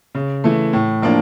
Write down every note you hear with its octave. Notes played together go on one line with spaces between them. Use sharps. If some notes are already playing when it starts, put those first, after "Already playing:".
C#3
E3 A3
A2
F3 A#3 D4